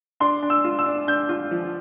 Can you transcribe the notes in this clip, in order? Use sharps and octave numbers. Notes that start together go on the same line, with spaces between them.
D4 C6
D4
E6
F4
E6
D4
D4 G6
F4
F3